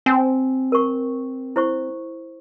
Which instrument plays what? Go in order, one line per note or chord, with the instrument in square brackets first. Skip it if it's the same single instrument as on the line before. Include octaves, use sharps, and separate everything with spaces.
[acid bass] C4 [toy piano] G#5
[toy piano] A#4 C#6
E4 C5 C#6